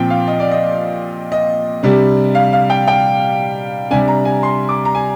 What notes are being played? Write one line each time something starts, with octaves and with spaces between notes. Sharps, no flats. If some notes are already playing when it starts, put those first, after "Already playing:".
Already playing: A#2 F3 C4 G5
F5
D#5
D5
D#5
D#5
C3 G3 D4
F5
F5
G5
G5
C3 G3 D4 G#5
A#5
G#5
C6
D6
A#5
G#5